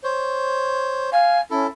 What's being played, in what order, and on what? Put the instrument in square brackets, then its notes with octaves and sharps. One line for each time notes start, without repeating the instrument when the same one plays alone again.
[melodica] C5 C#5
[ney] F5 [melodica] G#5
[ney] C#4 [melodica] E4 A4